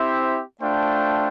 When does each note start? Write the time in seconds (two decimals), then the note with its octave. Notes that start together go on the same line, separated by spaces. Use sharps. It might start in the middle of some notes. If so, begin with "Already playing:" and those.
Already playing: C4 E4 G4 C5 E5
0.61 A3 D4 F4 C5 G5